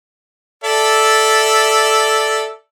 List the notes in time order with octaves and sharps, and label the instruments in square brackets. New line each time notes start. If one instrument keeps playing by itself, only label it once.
[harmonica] A4 D5 E5